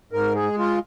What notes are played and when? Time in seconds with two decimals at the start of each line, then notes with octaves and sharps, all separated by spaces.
0.12 G#2 A#4
0.35 G#4
0.43 G#3
0.59 F4